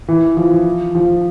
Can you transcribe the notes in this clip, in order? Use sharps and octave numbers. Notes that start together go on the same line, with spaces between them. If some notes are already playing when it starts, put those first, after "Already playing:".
E3
F3
F3